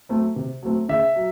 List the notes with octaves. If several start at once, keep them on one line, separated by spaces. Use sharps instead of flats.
F#3 A3 C4
C3
F#3 A3 C4
C#3 E5
F#3